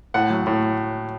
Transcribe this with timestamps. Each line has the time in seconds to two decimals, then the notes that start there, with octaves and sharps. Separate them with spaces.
0.14 A2 F#5
0.30 F#3
0.47 A2